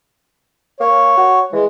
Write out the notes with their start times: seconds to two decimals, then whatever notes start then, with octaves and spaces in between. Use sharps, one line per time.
0.80 A#3 C#5
1.17 F#4
1.53 E3 G#3